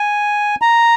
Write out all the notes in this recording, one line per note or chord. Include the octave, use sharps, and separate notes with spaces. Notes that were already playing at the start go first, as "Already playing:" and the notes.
Already playing: G#5
A#5